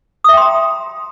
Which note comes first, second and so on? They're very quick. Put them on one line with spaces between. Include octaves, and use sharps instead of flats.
D#6 E5 G5 C6 A#5